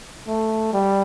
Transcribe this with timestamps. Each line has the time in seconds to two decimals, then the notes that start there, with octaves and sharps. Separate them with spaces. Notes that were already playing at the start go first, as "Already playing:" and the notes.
0.27 A3
0.73 G3